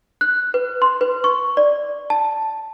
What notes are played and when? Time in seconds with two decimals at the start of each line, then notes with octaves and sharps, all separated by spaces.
0.21 F#6
0.54 B4
0.82 C6
1.01 B4
1.24 C#6
1.57 D5
2.10 A5